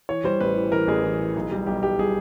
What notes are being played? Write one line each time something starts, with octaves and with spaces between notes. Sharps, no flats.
E3 C#5
G3 C5
A1 B4
E3
E3 A#4
A1 G#4
E3
E3
B1
G3
B1 G4
B1 G4
G3 G#4